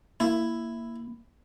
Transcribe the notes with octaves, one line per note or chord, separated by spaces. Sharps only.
A#3 E4